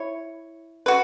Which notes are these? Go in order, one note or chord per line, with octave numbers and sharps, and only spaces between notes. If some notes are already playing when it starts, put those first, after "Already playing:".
Already playing: E4 C#5
F#4 B4